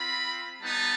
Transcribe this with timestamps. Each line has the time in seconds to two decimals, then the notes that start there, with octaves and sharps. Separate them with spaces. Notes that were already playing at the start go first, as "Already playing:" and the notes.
Already playing: C4 F4 B5
0.60 G3 B3 D#4 A5